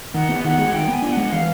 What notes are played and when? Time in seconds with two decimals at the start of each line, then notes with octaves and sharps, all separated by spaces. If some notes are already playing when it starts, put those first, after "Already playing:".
0.15 D#3 F#5
0.29 B3
0.44 D#3 F#5
0.58 G#3
0.73 D#3 G5
0.89 B3 G#5
1.02 D4
1.12 G#3 F#5
1.32 E3 F5